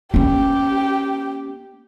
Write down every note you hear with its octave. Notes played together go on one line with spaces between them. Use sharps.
A#3 C#4 G4